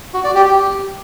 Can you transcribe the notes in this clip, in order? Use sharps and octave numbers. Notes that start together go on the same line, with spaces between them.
F#4
D5
G4
G4